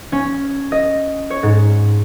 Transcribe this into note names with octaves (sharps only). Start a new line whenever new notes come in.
C#4
D#5
C#5
G#2